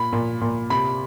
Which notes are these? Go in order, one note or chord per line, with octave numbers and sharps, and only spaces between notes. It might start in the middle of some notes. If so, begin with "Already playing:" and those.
Already playing: A#2 B5
A#2
A#2
C3 B5